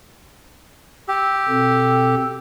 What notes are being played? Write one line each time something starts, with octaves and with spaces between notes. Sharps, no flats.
G4 E6
B2 C4 A4